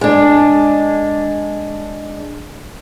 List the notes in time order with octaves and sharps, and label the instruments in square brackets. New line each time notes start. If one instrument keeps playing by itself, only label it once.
[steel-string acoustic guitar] G#3 D4